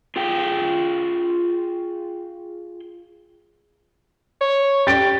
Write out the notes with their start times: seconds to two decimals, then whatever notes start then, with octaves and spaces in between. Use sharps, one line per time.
0.16 F4 G#4 F5 G5
4.41 C#5
4.87 G4 A6 D7